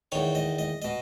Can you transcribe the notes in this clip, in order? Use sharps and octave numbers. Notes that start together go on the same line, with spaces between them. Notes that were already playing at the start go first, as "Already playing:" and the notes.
E2 D#3 C#5
D#5
D#5
B2 D#5